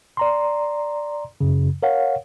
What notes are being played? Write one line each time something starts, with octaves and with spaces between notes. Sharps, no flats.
D5 A#5 C6
F#2 C#3
A#4 C#5 F5 F#5